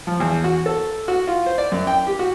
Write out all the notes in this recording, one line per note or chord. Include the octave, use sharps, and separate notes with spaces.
F3
E2
F#4
A4
F#4
F4
C5
D5
F#2
G5
G4
F#4